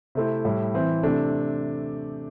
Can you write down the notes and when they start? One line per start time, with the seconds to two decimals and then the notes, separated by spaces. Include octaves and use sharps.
0.15 C3 A3 C4 E4
0.45 A2 G3 E4
0.74 E3 C4 E4
1.03 C3 A3 D4